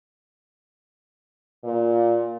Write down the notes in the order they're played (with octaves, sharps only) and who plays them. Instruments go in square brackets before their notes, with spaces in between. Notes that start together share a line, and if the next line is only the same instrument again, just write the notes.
[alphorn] A#2